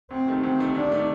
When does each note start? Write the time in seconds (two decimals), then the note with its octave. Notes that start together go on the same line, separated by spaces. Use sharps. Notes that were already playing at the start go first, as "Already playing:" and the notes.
0.10 D2 C4
0.27 C3 D#3 A3
0.43 D2 C4
0.59 C3 D#3 A3
0.75 D2 D4
0.92 C3 D#3 A3